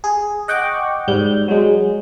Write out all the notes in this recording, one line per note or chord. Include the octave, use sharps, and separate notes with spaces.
G#4
D#5 F#5 G5 C#6 D6
G#2 G3 G6
F#3 G#3